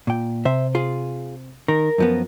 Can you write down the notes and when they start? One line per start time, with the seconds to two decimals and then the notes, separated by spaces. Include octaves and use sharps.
0.07 A#2 G5
0.45 C3 C5 E5
0.75 F4 G#4
1.68 D#3 A#4
1.98 F#2 F3 B3